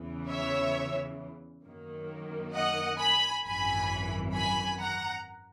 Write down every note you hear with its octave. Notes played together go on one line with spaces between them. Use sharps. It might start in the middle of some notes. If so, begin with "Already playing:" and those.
Already playing: E2 C#3 E3
C#5 E5
F#2 D#3 A#3
D#5 F#5
G#5 B5
G#1 F#2 E3 G#5 B5
G#5 B5
F#5 A#5